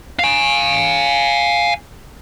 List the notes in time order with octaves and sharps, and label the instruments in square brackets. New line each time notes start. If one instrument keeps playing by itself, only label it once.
[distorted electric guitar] F5 G#5